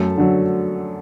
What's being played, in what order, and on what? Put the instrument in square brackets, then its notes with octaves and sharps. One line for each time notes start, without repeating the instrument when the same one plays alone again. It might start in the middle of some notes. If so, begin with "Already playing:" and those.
Already playing: [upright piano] F#2 A3 A4
D3 F#3